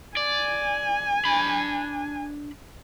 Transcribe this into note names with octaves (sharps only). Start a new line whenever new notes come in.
D5 G#5
D4 B5